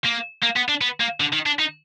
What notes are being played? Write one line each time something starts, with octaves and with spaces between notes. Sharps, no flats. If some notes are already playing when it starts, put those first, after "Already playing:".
A#3
A#3
B3
D4
B3
A#3
D3
D#3
D4
D#4